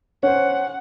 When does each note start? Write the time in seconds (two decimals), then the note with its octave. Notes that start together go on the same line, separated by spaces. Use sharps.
0.23 C#4 C5 F#5